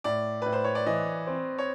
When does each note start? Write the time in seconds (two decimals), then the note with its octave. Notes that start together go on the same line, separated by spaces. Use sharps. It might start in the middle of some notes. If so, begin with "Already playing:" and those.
0.04 A2 D5
0.42 A2 B4
0.52 C5
0.64 C#5
0.75 D5
0.86 E3 D#5
1.27 C4
1.58 C#5